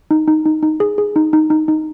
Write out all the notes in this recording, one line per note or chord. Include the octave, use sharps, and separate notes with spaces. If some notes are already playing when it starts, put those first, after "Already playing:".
D#4
D#4
D#4
D#4
G#4
G#4
D#4
D#4
D#4
D#4